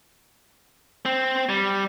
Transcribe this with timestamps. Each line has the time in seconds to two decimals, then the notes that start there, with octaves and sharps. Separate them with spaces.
1.05 C4
1.49 G3